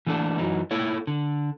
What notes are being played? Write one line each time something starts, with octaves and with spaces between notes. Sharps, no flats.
E3 A3 A#3 D4 A4
F#2 E3 F#3 D#4
A#3 E4 A4 C#5
D3